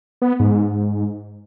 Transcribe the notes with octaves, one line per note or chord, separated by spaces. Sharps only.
B3
G#2